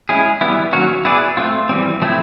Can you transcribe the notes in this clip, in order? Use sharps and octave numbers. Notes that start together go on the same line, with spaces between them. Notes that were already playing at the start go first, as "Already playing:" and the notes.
G#3 C#4 E4 G#4
E3 G3 B3 E4
D#3 F#3 A#3 C#4 F#4
B3 E4 G#4 B4 D5
A3 C4 F4
E3 G3 C4
F3 A3 C4 E4